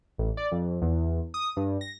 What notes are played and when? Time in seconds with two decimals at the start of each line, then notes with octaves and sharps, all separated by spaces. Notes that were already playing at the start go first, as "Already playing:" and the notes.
0.18 A1
0.37 D5
0.52 F2
0.82 E2
1.34 D#6
1.57 G2
1.81 A#6